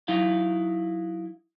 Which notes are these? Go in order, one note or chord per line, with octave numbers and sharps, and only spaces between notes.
F#3 D#4 E4 F5